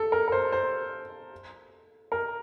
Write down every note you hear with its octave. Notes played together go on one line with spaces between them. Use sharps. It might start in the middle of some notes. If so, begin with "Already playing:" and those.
Already playing: A4
A#4
A#4
C5
C5
A#4